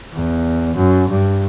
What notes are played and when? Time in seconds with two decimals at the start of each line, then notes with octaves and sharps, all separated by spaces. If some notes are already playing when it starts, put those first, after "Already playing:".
0.13 E2
0.76 F#2
1.09 G2